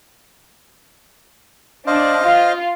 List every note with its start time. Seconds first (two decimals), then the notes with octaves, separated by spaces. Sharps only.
1.87 D4 C5 D#5 F5
2.22 F4